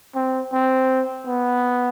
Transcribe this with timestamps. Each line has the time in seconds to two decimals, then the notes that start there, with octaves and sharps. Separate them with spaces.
0.15 C4
0.53 C4
1.27 B3